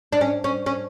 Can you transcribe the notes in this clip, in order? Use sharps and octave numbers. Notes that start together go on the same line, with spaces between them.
D4
C#4
C#4
C#4